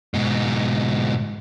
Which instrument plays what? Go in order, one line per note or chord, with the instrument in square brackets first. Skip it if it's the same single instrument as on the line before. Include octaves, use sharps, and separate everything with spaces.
[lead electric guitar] G#2 B2